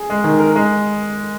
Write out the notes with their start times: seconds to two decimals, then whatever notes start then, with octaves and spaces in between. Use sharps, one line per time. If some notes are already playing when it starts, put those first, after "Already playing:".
Already playing: G#4
0.10 G#3
0.24 D#3
0.39 A#4
0.55 G#3